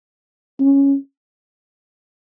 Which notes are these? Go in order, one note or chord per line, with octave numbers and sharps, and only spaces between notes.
C#4